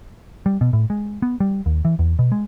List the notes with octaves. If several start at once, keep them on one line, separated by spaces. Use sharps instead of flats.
G3
B2
A2
G#3
B3
G3
D#2
E3
E2
B2
G#3